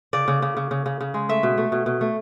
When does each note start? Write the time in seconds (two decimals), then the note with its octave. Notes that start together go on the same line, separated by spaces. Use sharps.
0.13 C#3 D5
0.28 C#3
0.42 C#3
0.57 C#3
0.71 C#3
0.86 C#3
1.01 C#3
1.14 G#3
1.29 A3 E5
1.43 B2
1.58 A3
1.72 B2
1.86 B2
2.01 A3